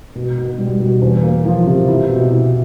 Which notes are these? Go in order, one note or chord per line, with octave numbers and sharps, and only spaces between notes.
B2
B2
G3
B2
E2
A#3
F3
C3
E4
B2
E4